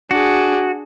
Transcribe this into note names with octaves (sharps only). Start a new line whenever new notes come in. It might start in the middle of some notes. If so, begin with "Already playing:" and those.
D4 F#4 G#4